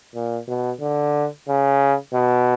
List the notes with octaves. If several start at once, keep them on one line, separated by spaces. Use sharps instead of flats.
A#2
B2
D3
C#3
B2